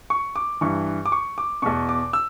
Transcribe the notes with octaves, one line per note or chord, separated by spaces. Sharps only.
C#6
D6
G2 E3 C#6
D6
C#6
D6
E2 B2 C#6
D6
E6